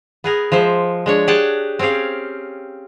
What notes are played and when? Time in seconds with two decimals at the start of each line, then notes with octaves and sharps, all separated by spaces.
0.24 B3 G#4 A#4
0.52 F3 G#3 C5 E5
1.06 G#3 D4 C#5
1.27 G4 G#4 F#5 G5 A5
1.79 C4 C#4 G4 G#4 F5